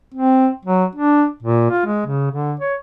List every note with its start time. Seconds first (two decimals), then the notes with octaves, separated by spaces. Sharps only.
0.14 C4
0.65 F#3
0.95 D4
1.43 A#2
1.70 F4
1.86 G#3
2.06 C#3
2.31 D3
2.60 C#5